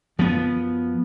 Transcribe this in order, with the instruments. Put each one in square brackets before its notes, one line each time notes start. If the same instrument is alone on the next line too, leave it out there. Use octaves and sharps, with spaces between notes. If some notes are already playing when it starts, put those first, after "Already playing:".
[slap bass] F#2 F3 B3